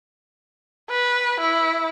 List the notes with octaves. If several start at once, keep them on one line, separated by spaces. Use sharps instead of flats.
B4
E4